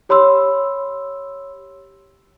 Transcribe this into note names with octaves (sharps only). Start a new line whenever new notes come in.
G4 C#5 B5 C6 E6